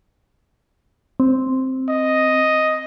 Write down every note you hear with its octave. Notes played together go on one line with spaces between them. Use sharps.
C4
D#5